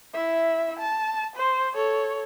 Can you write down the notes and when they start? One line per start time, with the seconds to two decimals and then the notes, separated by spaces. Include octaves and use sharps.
0.14 E4 E5
0.79 A5
1.36 C5
1.74 A4 C#5